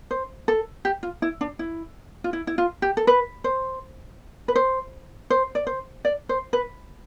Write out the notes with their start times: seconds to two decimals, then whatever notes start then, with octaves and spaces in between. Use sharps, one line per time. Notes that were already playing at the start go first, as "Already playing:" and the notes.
0.11 C5
0.48 A4
0.85 G4
1.03 F4
1.22 E4
1.41 D4
1.59 E4
2.24 F4
2.33 E4
2.47 E4
2.58 F4
2.82 G4
2.97 A4
3.07 B4
3.44 C5
4.48 B4
4.56 C5
5.30 C5
5.55 D5
5.67 C5
6.05 D5
6.29 C5
6.53 B4